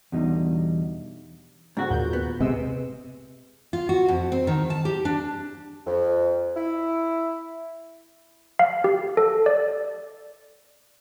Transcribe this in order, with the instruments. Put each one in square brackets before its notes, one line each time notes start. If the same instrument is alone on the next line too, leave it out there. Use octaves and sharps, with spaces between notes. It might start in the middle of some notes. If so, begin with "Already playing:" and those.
[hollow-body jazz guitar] E2 B2 D3 G3 D#4
[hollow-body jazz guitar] G#2 F#4 [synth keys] D3 C4 F#5
[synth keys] D#2 A#2 G6
[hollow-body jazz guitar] B3
[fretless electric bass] C3 [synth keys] G#3 E6
[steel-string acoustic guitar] F4
F#4
F2
C4
D#3
A5
G4
D4
[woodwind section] F2
E4
[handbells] F5
G4
A4
D5